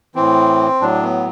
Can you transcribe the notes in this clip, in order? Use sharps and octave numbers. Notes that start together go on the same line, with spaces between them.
A2 E3 C4
A2 F#3 D4
B3